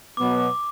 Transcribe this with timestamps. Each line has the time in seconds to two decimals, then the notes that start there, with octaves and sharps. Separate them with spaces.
0.17 B2 F#3 B3 D6
0.39 D6